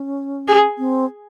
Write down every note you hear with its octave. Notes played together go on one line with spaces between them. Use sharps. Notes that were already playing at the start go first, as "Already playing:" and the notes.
Already playing: C#4
G#4
C4